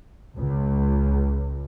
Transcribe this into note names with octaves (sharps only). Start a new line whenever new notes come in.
C#2